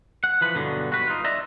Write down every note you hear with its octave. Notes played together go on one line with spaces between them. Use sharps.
F#5
E3 F3 B4
G2 B2 D3 F#3
F#4 B4
D#4 F4
D5 E5 A#5